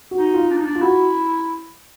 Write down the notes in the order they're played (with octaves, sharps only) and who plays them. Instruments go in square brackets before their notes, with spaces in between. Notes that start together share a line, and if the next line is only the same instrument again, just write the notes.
[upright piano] F#4
[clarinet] D#4
[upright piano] F4
[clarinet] D4
[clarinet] D#4 [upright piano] F4
[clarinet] D4
[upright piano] F4
[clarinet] E4 [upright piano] F#4